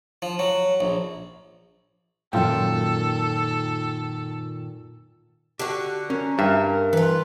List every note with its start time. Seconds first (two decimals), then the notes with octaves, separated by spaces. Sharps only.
0.22 F3
0.39 F#3
0.80 A#1
2.33 F#2 A#2 D#3 F4 A4 G5
5.59 D3 F#4 G4
6.10 C#4 A#4
6.39 G2 E5
6.93 E3 F4 B4